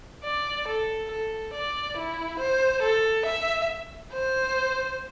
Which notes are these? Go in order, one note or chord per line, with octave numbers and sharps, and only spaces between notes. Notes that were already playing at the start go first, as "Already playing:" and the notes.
D5
A4
A4
D5
E4
C5
A4
E5
C5